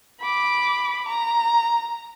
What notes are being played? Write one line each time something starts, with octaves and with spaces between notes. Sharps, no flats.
B5 D6
A#5